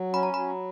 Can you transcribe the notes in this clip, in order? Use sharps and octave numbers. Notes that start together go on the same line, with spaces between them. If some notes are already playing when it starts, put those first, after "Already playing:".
Already playing: F#3
C#4 B5
A#5
F#3 B5